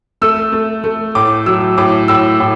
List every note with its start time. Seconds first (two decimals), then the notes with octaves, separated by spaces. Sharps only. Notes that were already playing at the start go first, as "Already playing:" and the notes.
0.22 A3 E6
0.53 A3
0.84 A3
1.15 A2 D6
1.46 F#3 E6
1.78 A2 D6
2.08 A2 E6
2.40 A2